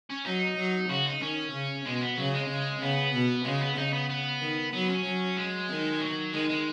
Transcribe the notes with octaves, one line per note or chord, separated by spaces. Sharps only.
C#4
F#3 D#4
F#3
C#3 F#4
D#4
D#3 C#4
C#3
B2 G#3
B3
C#3 F#3
G#3
C#3
C#3 B3
B2
C#3 G#3
B3
C#3 D#4
B3
B3
D#3
F#3 B3
C#4
F#3
G#3
D#3
F#3
D#3 G#3
G#3